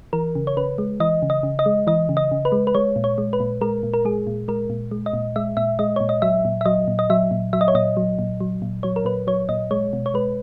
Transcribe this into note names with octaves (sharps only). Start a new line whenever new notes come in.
E3 A#4
C#3
C#5
C#3 B4
G#3
E3 D#5
C#3
D#5
C#3
D#5
G#3
E3 D#5
C#3
D#5
C#3
B4
G#3
B4
G#3 C#5
A#2
C#5
G#3
B4
A#2
G#3 A#4
A#2
A#4
G#3 G#4
A#2
G#3 A#4
A#2
G#3
D#5
A#2
G#3 E5
A#2 E5
G#3 D#5
A#2 C#5
D#5
F#3 E5
A#2
E5
F#3 D#5
A#2
D#5
F#3 E5
A#2
F#3 E5
D#5
C#5
A#2 D#5
F#3
A#2
F#3
A#2
F#3 C#5
A#4
A#2 B4
F#3 C#5
A#2 D#5
G#3 C#5
B2
C#5
G#3 B4